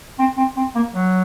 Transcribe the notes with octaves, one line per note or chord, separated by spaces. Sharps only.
C4
C4
C4
A#3
F#3